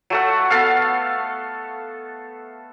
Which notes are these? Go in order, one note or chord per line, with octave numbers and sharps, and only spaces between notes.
F#3 A3 F#5
B3 A4 F5